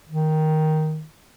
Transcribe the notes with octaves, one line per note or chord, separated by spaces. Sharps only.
D#3